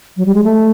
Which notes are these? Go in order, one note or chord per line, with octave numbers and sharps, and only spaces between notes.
F#3
G3
G#3
A3